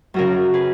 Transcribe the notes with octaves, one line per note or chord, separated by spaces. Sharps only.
F#2 C#3 F#4 A#4
G#4 B4